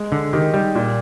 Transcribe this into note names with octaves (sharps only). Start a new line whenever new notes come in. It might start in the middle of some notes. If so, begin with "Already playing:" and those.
Already playing: G#3
D3
D#3 D#4 G4
G3
A#2